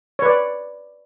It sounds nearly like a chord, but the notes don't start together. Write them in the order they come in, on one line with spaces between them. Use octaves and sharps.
C#5 B4 D5